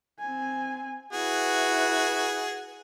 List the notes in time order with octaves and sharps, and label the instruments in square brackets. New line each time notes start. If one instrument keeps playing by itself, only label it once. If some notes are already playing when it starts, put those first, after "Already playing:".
[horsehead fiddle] C4 G#5
[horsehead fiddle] E4 B4 [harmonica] F#4 G#4